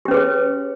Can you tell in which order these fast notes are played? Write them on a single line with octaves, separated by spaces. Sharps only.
G4 C#4 B4 G#4 C#5